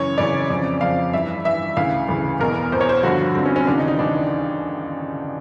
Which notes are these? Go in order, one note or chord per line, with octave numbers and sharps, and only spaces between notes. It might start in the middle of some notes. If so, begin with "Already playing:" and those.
Already playing: F#2 C#3 E3 C#5
F#2 C#3 E3 D5
F2 C#3 F3
F2 C#3 F3 F5
G2 E3 E5
G2 E3 E5
D2 C#3 E3 F5
D2 C#3 E3
E2 B2 A#4
E2 B2 C5
C#5
C5
G2 D3 F3 F#4
G2 D3 F3 C4
C#4
C#4
D#2 C#3 E3 D4
D#4
D#4
D#2 C#3 E3 D4